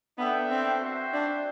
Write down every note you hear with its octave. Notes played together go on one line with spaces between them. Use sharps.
B3 D4 A4 E5 G5
C4
F#4 C5 E5 G5
D4